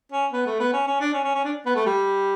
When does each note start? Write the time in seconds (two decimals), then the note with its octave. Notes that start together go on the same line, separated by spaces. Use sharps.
0.12 C#4
0.33 B3
0.46 A3
0.60 B3
0.73 C#4
0.87 C#4
1.00 D4
1.14 C#4
1.24 C#4
1.34 C#4
1.44 D4
1.66 B3
1.75 A3
1.86 G3